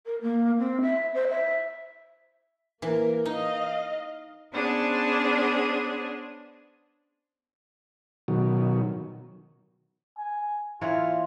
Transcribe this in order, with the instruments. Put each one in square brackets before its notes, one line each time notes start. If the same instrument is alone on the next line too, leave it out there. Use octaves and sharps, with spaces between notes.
[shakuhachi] A#4
A#3
C4
E5
C5
E5
[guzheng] E3 [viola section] A#3 A#4
[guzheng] D#4 [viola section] D#5 F5
[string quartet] B3 C#4 D4 G#4 C5
[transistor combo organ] B2 D#3 F#3
[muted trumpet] G#5
[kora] E3 A#3 C#5 [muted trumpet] F4